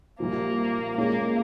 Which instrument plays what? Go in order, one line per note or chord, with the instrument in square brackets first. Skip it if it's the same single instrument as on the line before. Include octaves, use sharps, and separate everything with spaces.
[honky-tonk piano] C2 A#2 F3 [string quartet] A#3
[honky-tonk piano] A#2 G#3 C#4 [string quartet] A#3